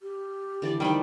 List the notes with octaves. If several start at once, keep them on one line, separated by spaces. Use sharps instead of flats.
G4
D3 E3 D5
D#3 G3 C5 F#5 B5